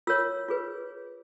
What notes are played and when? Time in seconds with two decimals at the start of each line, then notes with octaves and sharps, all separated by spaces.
0.07 F4 A#4 C#5 E6
0.48 F4 G#4 B4